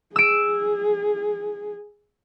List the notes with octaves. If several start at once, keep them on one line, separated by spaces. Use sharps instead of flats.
G#4 E6 D7